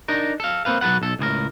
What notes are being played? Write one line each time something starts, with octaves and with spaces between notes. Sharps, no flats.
D4 D#4 A#4
A4 F5
A#3 C4 B4 F5
B1 F#3 A4 B4 F#5
B1 A4
C#2 A2 G#4 A#4